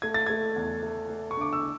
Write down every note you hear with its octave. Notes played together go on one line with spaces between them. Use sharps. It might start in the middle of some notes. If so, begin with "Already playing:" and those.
A3 G#6
A6
A3 G#6
E2
A3
A3
C#6
D3 D6
E6